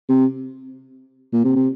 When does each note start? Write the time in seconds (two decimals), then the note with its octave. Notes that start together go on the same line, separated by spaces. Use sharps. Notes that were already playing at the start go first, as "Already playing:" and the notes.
0.09 C3
1.33 A#2
1.44 C3
1.56 C3